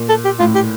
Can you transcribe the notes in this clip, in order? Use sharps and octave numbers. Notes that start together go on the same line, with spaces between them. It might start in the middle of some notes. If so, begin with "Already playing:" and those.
Already playing: A#2
A4
G4
A2 F4
G4